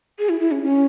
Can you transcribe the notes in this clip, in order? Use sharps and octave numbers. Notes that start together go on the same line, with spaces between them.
G#4
E4
E4
C#4
C#4